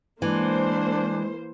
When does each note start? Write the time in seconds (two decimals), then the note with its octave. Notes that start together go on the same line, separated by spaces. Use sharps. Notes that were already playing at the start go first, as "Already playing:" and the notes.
0.22 E3 G#3 A#3 D4 C5